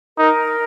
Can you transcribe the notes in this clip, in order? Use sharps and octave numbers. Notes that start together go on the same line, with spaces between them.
D#4 A#4